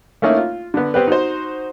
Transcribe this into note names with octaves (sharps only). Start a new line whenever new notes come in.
A3 A#3 C#4 D#4 E4
F4
D3 B3
B3 C4 G4 B4
D#4 F#4 C5